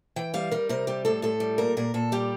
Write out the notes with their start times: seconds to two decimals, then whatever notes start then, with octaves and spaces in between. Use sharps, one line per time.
0.16 E3 G5
0.34 G3 F5
0.51 G3 A#4
0.69 C3 A#4
0.87 G3 G4
1.05 A2 A4
1.22 A2 A4
1.40 G3
1.58 A#2 A#4
1.77 A#2 A#4
1.94 A#2 A4
2.12 G3 G4